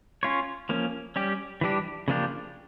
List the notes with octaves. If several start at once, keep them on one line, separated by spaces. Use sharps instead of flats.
C#4 F4 C#5
F3 A#3 C#4
G3 C#4 G4
E3 G3 D4 G4
C#3 F3 A#3 D4 G4